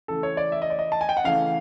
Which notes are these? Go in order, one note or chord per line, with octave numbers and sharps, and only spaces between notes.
C#3 E3 A3 A4
C#5
D5
E5
D#5
D5
D#5
A5
G#5
G5
F#5
C#3 E3 A3 F5